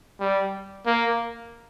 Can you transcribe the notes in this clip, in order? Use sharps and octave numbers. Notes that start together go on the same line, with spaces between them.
G3
A#3